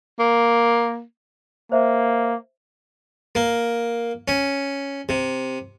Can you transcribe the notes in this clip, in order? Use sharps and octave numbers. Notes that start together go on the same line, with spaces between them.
A#3
A#3 C5 E5
A#3
C#4
C3